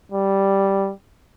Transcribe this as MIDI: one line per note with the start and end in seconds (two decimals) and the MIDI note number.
0.12 0.92 55